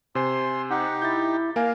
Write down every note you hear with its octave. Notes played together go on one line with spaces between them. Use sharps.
C3 C5 G#5 C6
D#4 G4 F#5
E4 G6 A6
A#3 A#4 F5 G#5